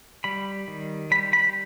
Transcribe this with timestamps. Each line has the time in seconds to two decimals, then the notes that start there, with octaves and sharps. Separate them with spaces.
0.24 G3 B5
0.68 D#3
1.11 G3 B5
1.33 B5